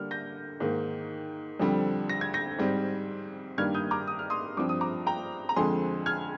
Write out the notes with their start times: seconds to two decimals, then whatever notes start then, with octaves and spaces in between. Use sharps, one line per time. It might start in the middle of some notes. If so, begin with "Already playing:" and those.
Already playing: D3 G3 A#3 F6
0.11 G6 A#6
0.60 G#2 D#3 A#3
1.60 F2 D3 G3 C4
2.09 A#6
2.21 G#6
2.34 G6 A#6
2.59 G#2 G3 C4
3.58 G2 D#3 G3 A#3 F6 G#6
3.74 D#6 G6
3.91 A#5 D6
4.08 D#6
4.19 F6
4.30 C6 D#6
4.57 G2 F3 C4 D6
4.69 D#6
4.81 A#5 D6
5.06 G5 A#5
5.49 A#5
5.56 F2 D3 G#3 C4 G#5 C6
6.06 F6 G#6